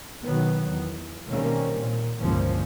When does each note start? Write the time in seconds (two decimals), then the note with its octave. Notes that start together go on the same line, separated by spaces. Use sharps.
0.23 B1 D#3 F#3 B3
0.68 E2
1.28 B2 D#3 G3 A#3 C4 C#4
1.79 A#2
2.21 G1 C#2 A#2 F3 A#3 C#4